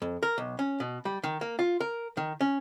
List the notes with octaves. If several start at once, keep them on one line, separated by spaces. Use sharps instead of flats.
F2
A#4
B1
C#4
B2
G3
D#3
A#3
F4
A#4
D#3
C#4